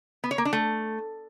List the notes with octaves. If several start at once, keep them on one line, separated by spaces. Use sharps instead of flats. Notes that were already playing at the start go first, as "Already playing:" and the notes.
B3
C#5
A#3
D4
A3